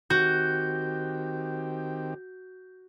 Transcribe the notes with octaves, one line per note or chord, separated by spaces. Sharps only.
D#3 C4 F#4 G4 G6